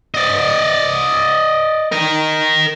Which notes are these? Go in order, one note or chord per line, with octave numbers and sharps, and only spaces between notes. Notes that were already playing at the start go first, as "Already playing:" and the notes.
D5 D#5
A#4 D#5